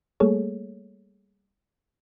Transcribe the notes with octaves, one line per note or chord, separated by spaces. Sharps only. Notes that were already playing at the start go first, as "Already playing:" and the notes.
G3 A3 A#3 G#4 A4 C#5